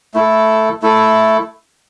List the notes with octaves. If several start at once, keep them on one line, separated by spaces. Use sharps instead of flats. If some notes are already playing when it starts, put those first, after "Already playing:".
A3 E4 A4
A3 E4 A4